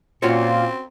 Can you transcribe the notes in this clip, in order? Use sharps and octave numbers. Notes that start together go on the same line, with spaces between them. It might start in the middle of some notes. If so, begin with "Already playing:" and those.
A#2 A#3 C4 C#4 F4 F#4 C#5